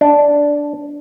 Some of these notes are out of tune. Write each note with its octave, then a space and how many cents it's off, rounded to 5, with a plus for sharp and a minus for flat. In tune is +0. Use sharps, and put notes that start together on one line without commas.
D4 -5